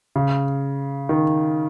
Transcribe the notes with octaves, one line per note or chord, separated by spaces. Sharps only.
C#3
D#3